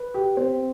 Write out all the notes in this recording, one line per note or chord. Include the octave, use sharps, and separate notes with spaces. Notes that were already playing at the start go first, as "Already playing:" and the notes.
Already playing: B4
G4
C4